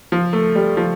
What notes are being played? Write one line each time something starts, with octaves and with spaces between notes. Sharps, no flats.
F3
A3
G3
F3